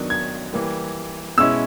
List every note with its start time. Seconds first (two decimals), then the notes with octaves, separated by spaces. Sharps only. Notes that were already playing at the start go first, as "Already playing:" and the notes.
Already playing: D#3 F#3 B3 D4
0.10 G#6
0.53 E3 G3 A#3
1.37 B2 G#3 C#4 E4 E6